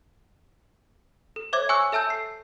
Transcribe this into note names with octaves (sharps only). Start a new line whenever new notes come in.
A4
C5 C#5 E5 D6 G#6
G#5 C#6 E6 F#6
A4 E5 A5 E6 G6
C7